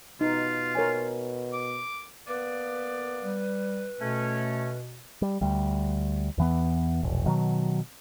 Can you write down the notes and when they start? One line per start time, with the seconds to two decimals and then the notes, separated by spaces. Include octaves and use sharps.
0.21 B2 D#4 F4
0.75 A#4 C#5 G#5
1.53 D6
2.28 A#3 B3 B4 D5
3.24 G3
4.01 B2 A3 C#4
5.22 G3
5.41 D2 G3
6.38 E2 E3 B3
7.03 E1 A#1
7.26 B2 D#3 F#3